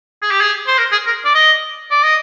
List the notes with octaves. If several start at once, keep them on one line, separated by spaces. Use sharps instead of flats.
G#4
G4
G#4
C5
A#4
G#4
A#4
D5
D#5
D5
D#5